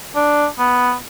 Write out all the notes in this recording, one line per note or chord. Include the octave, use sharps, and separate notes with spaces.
D4
B3